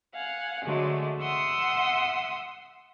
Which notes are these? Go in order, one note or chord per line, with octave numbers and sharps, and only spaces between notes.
F5 F#5 G#5
D3 F#3 G#3 A3
E5 F#5 C6 D#6 E6